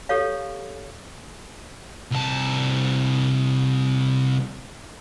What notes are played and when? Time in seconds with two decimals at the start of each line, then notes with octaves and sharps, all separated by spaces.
0.09 G4 A4 C#5 F5
2.12 C2 A5